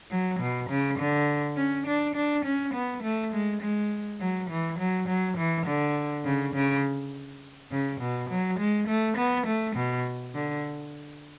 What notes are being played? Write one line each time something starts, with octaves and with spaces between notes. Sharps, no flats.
F#3
B2
C#3
D3
C#4
D4
D4
C#4
B3
A3
G#3
G#3
F#3
E3
F#3
F#3
E3
D3
C#3
C#3
C#3
B2
F#3
G#3
A3
B3
A3
B2
D3